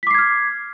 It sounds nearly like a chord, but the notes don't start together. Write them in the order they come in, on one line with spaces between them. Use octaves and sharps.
B6 D6 C7 G#6 F6